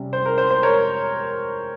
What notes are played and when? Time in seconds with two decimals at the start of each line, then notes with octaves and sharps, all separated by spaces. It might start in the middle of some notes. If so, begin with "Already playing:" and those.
Already playing: C3 G3 C#4
0.13 C5
0.26 A#4
0.38 C5
0.51 C5
0.63 A#4 C#5